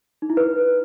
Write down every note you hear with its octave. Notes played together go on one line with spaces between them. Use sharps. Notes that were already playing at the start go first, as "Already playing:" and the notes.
D#4
E4
B4